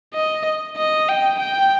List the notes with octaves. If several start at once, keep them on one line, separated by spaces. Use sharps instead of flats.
D#5
D#5
G5
G5